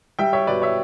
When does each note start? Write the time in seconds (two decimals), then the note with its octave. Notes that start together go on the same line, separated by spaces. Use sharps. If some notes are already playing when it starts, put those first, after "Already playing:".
0.19 G3 E5 G5
0.33 C#5 E5
0.47 B2 B4 D5
0.62 C#5 E5